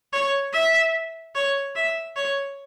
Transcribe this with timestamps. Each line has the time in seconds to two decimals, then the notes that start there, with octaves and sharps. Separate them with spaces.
0.13 C#5
0.53 E5
1.35 C#5
1.75 E5
2.16 C#5